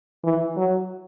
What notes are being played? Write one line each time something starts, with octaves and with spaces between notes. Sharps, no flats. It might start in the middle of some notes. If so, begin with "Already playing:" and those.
E3
F#3